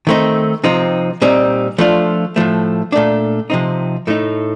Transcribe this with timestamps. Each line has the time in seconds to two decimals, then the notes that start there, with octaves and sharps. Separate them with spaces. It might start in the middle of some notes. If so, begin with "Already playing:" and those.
0.07 D#3 A3 C4 D#4
0.64 C3 F3 C4 D#4
1.22 A#2 G3 C4 D#4
1.78 F3 A3 D4 F4
2.36 A2 F3 A3
2.92 A#2 A3 D4
3.50 C3 F3 C4 D#4
4.07 A2 A3 D#4